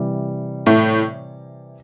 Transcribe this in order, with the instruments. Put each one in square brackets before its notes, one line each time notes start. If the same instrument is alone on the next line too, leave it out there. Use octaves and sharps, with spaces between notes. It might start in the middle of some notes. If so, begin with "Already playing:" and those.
Already playing: [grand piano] C3 E3 G3
[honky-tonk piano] A2 A3